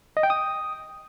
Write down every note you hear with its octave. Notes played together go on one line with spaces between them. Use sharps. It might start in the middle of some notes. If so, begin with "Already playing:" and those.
D#5
G5
D#6